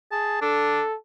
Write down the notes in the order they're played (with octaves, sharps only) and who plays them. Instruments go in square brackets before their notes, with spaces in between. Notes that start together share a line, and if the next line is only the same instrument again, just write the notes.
[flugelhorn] G#4 [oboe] A5
[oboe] D4 [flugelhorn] A4